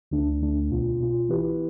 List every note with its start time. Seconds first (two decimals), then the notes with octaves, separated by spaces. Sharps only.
0.11 D2 D3 A3 D4
0.41 D2 D3 A3 D4
0.70 C2 B2 B3 F4
1.00 C2 B2 B3 F4
1.29 E3 B3 E4 G4 B4